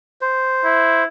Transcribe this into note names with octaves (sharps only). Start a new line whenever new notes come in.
C5
E4